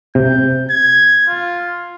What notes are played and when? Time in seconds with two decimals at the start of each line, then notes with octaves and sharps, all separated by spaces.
0.15 C3 G6
0.70 G#6
1.28 F4